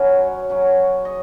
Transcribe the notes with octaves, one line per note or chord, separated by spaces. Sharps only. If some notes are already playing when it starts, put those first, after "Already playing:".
Already playing: F#3 C#4 B4 C#5
F#3 C#4
D#5